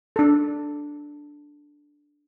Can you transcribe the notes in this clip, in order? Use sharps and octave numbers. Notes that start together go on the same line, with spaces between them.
D4 A4